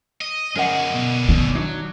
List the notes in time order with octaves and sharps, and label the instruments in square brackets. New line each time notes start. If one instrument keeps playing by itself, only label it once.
[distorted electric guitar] D#5
[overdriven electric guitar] F#2 [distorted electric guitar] D3 G#4 [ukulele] A#4 D#5 F#5
[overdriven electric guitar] B2
[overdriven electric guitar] B2 [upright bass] D#3
[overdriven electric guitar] F#3 [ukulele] D4 D#4